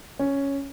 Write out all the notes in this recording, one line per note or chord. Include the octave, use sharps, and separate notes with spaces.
C#4